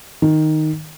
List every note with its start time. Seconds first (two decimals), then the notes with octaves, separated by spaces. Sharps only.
0.22 D#3